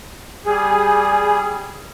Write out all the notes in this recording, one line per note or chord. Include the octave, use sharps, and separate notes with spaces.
G3 G#4